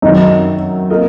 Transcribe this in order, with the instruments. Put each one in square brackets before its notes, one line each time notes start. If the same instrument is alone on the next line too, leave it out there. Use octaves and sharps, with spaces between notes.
[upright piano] F#2 D#3 F#3 [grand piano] D#4
[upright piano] A#3 F4 A#4 D#5